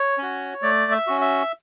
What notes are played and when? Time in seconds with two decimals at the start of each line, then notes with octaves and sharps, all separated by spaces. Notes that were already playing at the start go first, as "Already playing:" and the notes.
Already playing: C#5
0.18 C#4 F#4
0.62 A3 D5
0.92 E5
1.07 C#4 F#4
1.21 E5